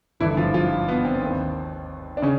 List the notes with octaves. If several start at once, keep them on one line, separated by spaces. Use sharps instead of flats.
G#1 G2 D3 E3 E4
F3 F4
F3 F4
B3
C4
D#2 D#3
D4
C#3 C#4